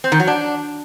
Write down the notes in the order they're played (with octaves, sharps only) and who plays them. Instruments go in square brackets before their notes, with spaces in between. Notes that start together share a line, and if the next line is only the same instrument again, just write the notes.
[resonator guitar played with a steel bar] C4
D#3
F#3
D4